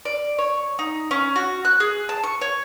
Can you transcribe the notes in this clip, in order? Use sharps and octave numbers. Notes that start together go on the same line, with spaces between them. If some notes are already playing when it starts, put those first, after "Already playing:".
D5
C#5
D#4
C#4
F#4
F#6
G#4
A5
C#6
C#5